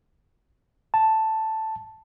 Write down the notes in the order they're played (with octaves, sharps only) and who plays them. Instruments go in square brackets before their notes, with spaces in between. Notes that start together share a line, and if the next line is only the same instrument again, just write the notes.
[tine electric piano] A5